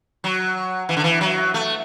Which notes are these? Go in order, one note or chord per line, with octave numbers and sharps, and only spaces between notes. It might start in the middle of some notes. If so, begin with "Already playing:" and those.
F#3
E3
D3
E3
F#3
A3